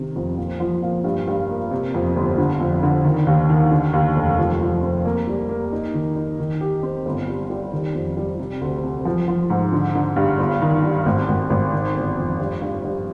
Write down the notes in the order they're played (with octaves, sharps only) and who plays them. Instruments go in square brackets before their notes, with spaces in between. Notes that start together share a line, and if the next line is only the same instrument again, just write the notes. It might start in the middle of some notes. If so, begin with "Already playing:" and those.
Already playing: [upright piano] C3 D#3
F2
A#2
F3
A#2
G2
G2
A#3
C3
F2
G1
D3
F2
D3
D#3
D#2
D#3
D3
D#2
F1
F3
F3
C4
A#3
G3
A#3
D#4
D#3
D#4
D#3
G4
C4
G1
G3
G3
D#3
F2
G3
C3
D2
C3
F3
F3
G#2
D3
D3
G2
G1
D#3
G3
G#1
G#1
G#1
D#3
G1
F2
G2
G2
G2